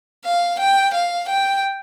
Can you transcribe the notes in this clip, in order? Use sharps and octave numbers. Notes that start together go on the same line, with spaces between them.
F5
G5
F5
G5